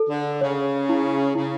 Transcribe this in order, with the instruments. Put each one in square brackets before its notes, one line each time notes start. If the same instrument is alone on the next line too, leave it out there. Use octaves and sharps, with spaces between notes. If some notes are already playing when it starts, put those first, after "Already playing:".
Already playing: [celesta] A4
[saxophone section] D3
[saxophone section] C#3 [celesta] C#5
[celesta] E4
[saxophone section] C#3 [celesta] E4